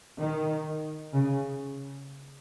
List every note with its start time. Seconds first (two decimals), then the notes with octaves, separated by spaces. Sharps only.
0.19 D#3
1.13 C#3